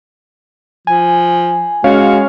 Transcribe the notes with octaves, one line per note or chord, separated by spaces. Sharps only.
F3 G#5
G#3 C#4 F#4 C#5 F5